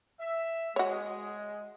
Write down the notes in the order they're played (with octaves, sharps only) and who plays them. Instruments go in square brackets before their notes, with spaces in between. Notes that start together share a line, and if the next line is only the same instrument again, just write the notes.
[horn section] E5
[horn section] G#3 [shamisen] F#4 C#5